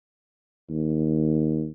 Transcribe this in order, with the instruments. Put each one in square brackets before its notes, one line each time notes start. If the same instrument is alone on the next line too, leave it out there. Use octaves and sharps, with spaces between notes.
[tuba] D#2